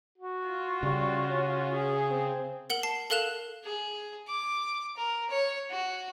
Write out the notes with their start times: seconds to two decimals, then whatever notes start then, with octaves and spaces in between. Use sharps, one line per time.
0.18 F#4
0.48 F4
0.83 C#3 G3
1.29 C#4
1.74 G#4
2.10 C4
2.70 A#4 F#5 F#7 G7
2.83 A5 C7
3.10 A4 A#4 F5 F#6 E7 F7
3.64 G#4
4.27 D6
4.97 A#4
5.30 C#5
5.70 F#4